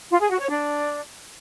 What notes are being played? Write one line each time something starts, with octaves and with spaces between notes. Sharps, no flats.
F4
G#4
F#4
C#5
D4